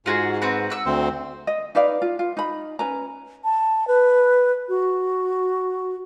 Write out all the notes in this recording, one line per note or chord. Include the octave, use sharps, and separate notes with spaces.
G#2 F4 F#4 G#4
C4 F#4 B4
F#5 E6
D2 C4 C5
D#5
D#4 B4 D5 F5
F4
F4
D#4 B5
C#4 B4 A#5
A5
B4
F#4